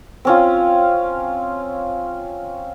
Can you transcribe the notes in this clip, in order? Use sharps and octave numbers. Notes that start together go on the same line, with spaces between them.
C4 C#4 F4